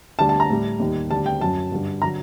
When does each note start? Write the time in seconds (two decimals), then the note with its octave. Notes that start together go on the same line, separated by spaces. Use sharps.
0.19 D2 D3 G3 A5
0.29 A5
0.40 A#5
0.50 A2 G3
0.80 D#2 D#3 G3
1.11 D2 D3 G3 A5
1.26 G5
1.40 F#2 F#3 A5
1.72 G2 D3 G3
2.02 D3 F#3 A#5